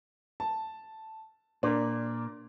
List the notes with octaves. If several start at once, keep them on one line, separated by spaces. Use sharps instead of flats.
A5
A#2 D4 A#4